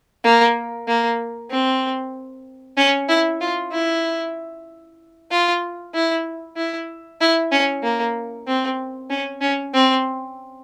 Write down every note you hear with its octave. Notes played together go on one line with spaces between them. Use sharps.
A#3
A#3
C4
C#4
E4
F4
E4
F4
E4
E4
E4
C#4
A#3
C4
C#4
C#4
C4